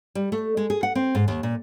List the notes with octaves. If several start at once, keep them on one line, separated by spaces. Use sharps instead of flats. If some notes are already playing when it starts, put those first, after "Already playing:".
G3
A3
G#3
G#4
F#5
C4
G#2
D#2
A#2